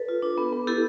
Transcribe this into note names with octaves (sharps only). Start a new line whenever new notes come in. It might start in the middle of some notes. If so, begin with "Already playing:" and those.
Already playing: A4 B4
F4
D4
B3
B3
E4 G4 A4